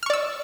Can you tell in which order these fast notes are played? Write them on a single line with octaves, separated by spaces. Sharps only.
F6 C#6 D5 E6